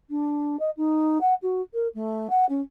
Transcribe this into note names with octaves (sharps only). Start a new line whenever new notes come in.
D4
D#5
D#4
F#5
F#4
A#4
A3
F#5
C#4